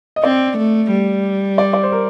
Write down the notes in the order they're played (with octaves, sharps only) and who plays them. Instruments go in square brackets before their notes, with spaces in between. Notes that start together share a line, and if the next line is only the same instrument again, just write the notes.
[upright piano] D#5
[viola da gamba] C4 [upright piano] D5
[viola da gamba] A3
G3
[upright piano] D5
D5
C5
A#4